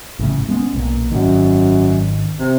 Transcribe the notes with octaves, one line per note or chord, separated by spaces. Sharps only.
A1 C#3 A3
G#3 B3 C#4
B1 A#2
G#1 F#2 D#3
C3